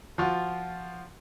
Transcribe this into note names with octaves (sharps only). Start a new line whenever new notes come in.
F3 F4 F#4